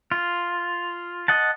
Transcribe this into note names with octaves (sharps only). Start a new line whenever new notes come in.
F4
D#5 F#5 A5